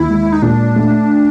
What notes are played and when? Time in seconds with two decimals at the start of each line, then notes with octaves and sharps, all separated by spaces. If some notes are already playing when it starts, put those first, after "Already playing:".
Already playing: D#2 E4
0.09 G#3
0.32 D#4
0.42 A#2 D4
0.76 A3